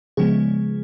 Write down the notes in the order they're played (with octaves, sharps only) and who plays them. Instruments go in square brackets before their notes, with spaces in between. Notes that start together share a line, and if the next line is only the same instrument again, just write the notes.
[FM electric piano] C#3 F3 G#3 B3 G#4